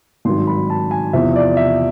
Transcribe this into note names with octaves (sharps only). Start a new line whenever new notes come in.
G#1 G2 D#3 F#3 C6
B5
A5
G#5
E2 C3 F3 E5
D5
E5